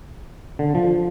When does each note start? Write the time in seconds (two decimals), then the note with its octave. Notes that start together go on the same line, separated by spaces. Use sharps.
0.59 D3
0.75 F3